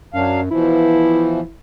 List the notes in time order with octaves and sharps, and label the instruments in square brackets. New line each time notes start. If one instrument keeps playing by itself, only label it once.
[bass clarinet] F#2 [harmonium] F#3 D4 F5
[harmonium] B2 E3 F3 [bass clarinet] E4